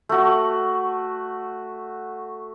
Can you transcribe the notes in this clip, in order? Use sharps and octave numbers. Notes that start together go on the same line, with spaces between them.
A3 F#4